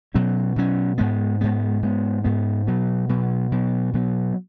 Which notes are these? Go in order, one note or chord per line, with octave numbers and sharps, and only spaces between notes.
B2 F#3 C#4
B2 F#3 C#4
G#2 G#3 B3
G#2 G#3 B3
G#2 G#3 B3
G#2 G#3 B3
B2 F#3 B3
B2 F#3 B3
B2 F#3 B3
B2 F#3 B3